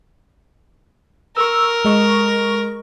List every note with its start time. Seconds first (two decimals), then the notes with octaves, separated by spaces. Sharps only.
1.37 A#4 C#6 E6
1.85 G#3 D#5 C#6